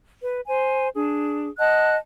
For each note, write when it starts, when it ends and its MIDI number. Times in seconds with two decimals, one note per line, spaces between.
0.21 0.39 71
0.48 0.89 72
0.48 0.89 80
0.94 1.48 62
0.94 1.48 68
1.59 1.97 75
1.59 1.97 78
1.59 1.97 81
1.59 1.97 90